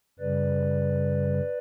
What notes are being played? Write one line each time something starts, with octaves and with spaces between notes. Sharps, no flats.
F#2 C#3 G3 B4 D5